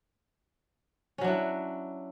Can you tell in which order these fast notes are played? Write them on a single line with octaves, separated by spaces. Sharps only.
C#4 F#3 D4 E4